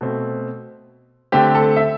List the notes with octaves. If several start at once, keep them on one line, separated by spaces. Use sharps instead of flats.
B2 A3 C4
D3 A3 C4 G4
A4
E5